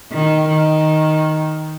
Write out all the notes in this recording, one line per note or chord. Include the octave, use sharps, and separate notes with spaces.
D#3
D#3